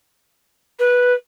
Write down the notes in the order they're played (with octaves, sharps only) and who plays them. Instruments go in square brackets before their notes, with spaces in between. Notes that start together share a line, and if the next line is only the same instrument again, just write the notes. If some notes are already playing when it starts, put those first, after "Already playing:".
[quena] B4